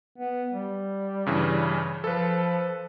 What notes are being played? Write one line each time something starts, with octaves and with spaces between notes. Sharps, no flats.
B3
G3
G2 C#3 E3
F3 A4 B4